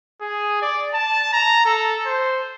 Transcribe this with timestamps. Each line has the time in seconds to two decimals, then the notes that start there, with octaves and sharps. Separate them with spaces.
0.21 G#4
0.62 D5
0.94 A5
1.33 A#5
1.65 A4
2.06 C5